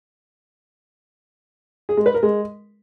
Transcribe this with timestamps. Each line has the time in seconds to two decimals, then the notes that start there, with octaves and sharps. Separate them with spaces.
1.89 G#4
1.97 G#3
2.06 B4
2.14 A#4
2.23 G#3